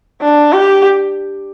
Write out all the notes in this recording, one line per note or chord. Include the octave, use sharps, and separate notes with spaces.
D4
G4